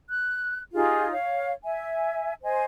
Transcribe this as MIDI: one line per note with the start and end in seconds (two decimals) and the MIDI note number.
0.10 0.60 90
0.74 1.11 63
0.74 1.11 65
0.74 1.11 67
0.74 1.11 68
1.11 1.51 73
1.11 1.51 77
1.64 2.33 76
1.64 2.33 80
2.43 2.65 72
2.43 2.65 75
2.43 2.65 80